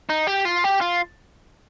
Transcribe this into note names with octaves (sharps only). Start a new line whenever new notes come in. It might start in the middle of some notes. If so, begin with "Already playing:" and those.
D#4
G4
F4
G4
F4